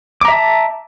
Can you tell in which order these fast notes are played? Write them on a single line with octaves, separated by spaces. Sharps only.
D6 A#5 E5 A5